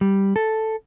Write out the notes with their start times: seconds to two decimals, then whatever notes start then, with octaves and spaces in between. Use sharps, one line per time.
0.01 G3
0.36 A4